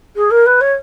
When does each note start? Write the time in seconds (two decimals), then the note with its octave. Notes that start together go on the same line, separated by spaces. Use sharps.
0.16 G#4
0.30 A#4
0.46 B4
0.61 C#5